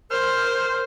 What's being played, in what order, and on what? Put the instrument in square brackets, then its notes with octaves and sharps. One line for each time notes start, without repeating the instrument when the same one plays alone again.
[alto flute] A#4 [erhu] C5 [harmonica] F6